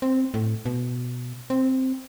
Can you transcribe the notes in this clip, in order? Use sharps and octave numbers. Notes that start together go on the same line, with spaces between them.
C4
A2
B2
C4